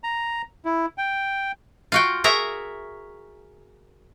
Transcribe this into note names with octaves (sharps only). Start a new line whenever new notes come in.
A#5
E4
G5
F4 F#4 G5
F#4 G#4 A#4 E5 A#5